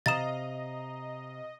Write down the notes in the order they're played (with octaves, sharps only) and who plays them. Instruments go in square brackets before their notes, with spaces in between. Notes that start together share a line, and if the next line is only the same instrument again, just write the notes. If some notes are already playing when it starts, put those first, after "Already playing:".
[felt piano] C3 [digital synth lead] D#5 [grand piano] F5 A#5 D#6 [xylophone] A6 E7